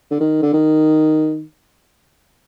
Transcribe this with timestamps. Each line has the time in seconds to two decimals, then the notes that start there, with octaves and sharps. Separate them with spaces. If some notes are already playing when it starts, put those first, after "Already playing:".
0.11 D3
0.20 D#3
0.42 D3
0.53 D#3